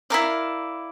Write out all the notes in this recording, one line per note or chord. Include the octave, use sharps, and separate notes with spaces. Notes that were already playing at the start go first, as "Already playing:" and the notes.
E4 A#4 D5 F5